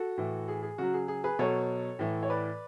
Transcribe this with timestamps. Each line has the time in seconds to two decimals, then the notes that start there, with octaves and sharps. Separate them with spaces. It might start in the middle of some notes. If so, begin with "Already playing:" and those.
Already playing: F#4 A4
0.17 A2 E3
0.48 G#4
0.63 G#4
0.78 C#3 F#3 F#4
0.94 G#4
1.08 G#4
1.24 G#4 B4
1.39 B2 F#3 A4 C#5
1.99 A2 E3
2.23 C#5
2.30 B4 D5